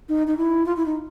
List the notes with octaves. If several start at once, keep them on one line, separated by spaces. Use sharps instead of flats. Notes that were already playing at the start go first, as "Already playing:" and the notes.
D#4
D#4
E4
F4
E4
D#4